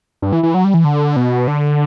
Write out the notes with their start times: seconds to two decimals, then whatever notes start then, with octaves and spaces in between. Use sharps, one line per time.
0.22 G2
0.33 E3
0.43 E3
0.54 F#3
0.64 G3
0.74 E3
0.84 D3
1.16 B2
1.48 D3